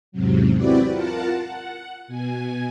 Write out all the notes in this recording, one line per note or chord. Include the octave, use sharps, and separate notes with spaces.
E2 G#2 C3 F#3
C4 E4 F#4 G4 B4 D5
F4 A#4 F#5 A5
F#5
B2 G#5